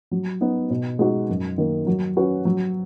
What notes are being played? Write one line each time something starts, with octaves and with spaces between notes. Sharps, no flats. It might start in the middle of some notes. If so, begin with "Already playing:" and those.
F#3
B3 D#4
B2
G#3 D#4 F#4
F#2
D#3 A#3
F#3
C#4 F#4 B4
F#3